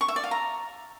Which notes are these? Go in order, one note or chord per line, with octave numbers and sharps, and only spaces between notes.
C#6
E5
D5
F5
A#5